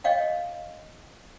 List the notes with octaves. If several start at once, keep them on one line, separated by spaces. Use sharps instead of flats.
C#5 D#5 F5 G5